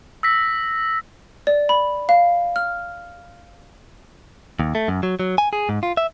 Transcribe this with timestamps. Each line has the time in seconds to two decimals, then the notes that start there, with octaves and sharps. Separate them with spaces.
0.23 E6 A#6 B6
1.47 D5
1.69 B5
2.09 F5
2.56 F6
4.60 D#2
4.75 A3
4.88 F#2
5.03 F#3
5.20 F#3
5.38 G#5
5.53 G#4
5.69 G#2
5.83 F4
5.97 E5